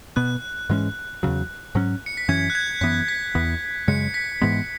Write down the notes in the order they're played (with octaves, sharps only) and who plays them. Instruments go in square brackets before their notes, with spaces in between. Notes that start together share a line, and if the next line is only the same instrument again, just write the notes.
[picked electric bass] B2 B3 [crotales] F#6
[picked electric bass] G#2 E3 G#3 C#4
E2 C#3 F#3
G#2 F#3 C#4
[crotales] C#7
B6
[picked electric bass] F#2 E3 C#4 [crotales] G#6
[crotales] F#6
G#6
[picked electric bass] F#2 E3 B3 [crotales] B6
[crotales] B6
[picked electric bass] E2 E3 B3
[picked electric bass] F#2 C#3 G#3 [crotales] C#7
[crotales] B6
[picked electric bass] G#2 E3 G#3 B3